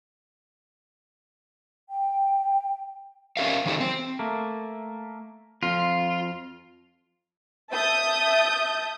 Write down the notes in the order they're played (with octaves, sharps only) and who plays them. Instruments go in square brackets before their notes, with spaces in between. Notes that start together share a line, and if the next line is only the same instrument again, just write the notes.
[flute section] G5
[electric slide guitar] C4 C#4 G4 A#4 E5 F5
D#3 E3 F#3 D#4 G4 A4
C4
[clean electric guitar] A3 A#3
[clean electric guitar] F2 [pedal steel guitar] F4
[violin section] E5 A5 D#6 G6